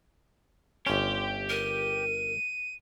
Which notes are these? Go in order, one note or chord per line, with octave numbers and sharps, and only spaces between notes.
G1 C#4 G4 C6
A#4 D#7